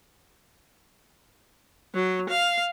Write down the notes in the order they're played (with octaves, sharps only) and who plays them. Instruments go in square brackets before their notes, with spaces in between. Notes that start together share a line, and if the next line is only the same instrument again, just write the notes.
[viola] F#3
F5